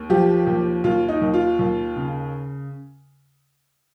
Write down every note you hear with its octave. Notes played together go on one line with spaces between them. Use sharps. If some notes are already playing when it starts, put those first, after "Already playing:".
Already playing: D#2
F3 G4
D#2
D#2 F4
D#4
D#2
F4
D#2
C#3